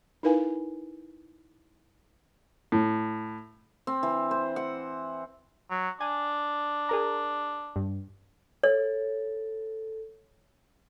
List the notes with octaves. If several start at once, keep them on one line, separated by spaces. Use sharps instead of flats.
D#4 E4 A#4 B4 F5 G#5
A2
C4
E3
C5
F#5
F#3
D4 G#5
G#4 A#4 A#5
G2
A4 C#5